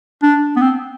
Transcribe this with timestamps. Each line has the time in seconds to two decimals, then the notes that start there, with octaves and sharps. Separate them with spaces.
0.23 D4
0.56 B3
0.61 C4